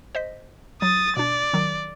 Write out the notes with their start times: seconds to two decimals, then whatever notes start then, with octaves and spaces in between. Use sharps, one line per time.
0.15 C5 D#5 B6
0.82 F#3 D#6 A6
1.17 B2 D4 D5
1.53 D#3 F#3